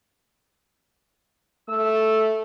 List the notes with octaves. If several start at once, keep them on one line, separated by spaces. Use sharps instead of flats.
A3 E6